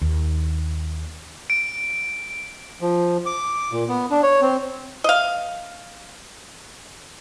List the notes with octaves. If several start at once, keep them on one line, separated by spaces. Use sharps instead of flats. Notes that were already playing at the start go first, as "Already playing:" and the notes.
D#2
D7
F3
D6
A#2
B3
D4
C#5
C4
D#5 F5